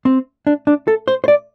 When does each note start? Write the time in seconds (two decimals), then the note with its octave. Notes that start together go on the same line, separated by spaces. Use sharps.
0.05 C4
0.47 D4
0.67 D4
0.88 A4
1.08 C5
1.24 C5
1.28 D5